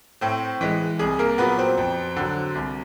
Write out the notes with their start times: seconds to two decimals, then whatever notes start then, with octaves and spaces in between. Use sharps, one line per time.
0.21 A2 C4 C5
0.61 E3 G#3
0.99 C2 G#4
1.19 A#3 A#4
1.38 A#2 F#3 B3 B4
1.59 C4 C5
1.78 F2
2.16 D3 F#3
2.55 C2